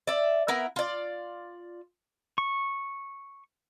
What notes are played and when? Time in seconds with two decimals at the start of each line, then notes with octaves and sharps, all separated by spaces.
0.07 D5 E5
0.48 B3 E4 A#4
0.76 F4 D5
2.38 C#6